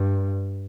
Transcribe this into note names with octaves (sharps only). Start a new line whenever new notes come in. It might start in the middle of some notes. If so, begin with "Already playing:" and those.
Already playing: G2